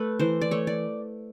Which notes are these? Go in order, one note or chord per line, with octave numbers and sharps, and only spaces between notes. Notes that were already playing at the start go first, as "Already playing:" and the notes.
Already playing: A3 B4
E3 C5
D5
A3 C#5
D5